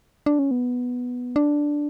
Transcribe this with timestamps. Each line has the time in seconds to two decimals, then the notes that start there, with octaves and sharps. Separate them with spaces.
0.26 D4
0.39 C#4
0.51 B3
1.36 D4